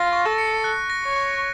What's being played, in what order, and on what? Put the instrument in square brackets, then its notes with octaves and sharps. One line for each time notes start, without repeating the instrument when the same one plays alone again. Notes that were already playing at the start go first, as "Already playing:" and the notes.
Already playing: [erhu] F4 [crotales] A#6
[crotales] C#6
[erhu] A4
[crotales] C#7
F#6
A#6
[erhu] C#5
[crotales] C#6